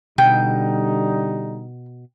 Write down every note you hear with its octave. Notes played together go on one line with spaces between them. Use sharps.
B2 D3 G3 D#4 G5